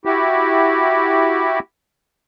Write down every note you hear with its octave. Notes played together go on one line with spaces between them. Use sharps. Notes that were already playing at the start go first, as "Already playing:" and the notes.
E4 F#4 G4